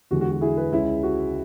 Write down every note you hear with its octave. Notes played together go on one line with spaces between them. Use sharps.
E2 D3 G#3 F#4
F#4
F#4
E4 G#4
G#4 B4
C#2 C#3 G#3 E4
F#4